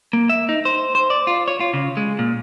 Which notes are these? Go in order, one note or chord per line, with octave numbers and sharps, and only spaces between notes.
A#3
E5
D#4
C5
C5
D5
F4
C#5
F4
C#3
G#3
A#2